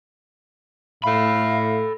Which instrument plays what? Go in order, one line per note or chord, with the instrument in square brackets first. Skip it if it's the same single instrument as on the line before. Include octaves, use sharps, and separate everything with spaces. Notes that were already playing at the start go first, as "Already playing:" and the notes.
[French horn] A2 [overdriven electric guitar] A4 B5 [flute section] E5 F5